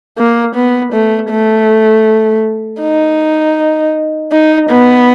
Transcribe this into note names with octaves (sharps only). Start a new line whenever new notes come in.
A#3
B3
A3
A3
D#4
D#4
B3